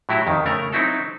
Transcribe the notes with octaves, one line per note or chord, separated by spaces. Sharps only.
A2 F#3 E4 F#4 G4
F2 D#3
C#3 A3 A#4 C#5
F#3 C4 D#4 E4 F#4 A4